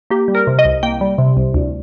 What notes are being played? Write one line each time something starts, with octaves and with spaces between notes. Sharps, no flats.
A#3 G4
G3
A#4
C3
D#5
C2
A#3 G5
G3
C3
C2
D2